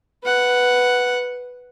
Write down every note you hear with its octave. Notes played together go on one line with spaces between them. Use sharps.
B4 F#5